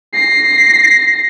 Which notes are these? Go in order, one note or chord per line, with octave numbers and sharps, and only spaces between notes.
A#6 C7